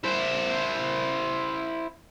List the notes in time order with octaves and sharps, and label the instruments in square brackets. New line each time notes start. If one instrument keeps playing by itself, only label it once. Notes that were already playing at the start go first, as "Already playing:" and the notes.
[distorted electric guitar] E4 C5